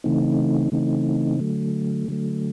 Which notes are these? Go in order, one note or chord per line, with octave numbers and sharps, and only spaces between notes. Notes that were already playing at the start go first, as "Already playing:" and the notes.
C#3 E3 A3 C4 D#4
C#3 E3 A3 C4 D#4
D3 F#3 A3
D3 F#3 A3